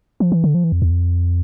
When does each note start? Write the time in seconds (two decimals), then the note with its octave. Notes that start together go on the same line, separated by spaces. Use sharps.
0.20 F3
0.32 E3
0.44 D3
0.55 F3
0.64 E3
0.72 F2
0.82 E2
0.91 F2